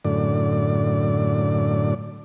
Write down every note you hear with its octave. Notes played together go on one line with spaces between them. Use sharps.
F#2 A2 D3 D5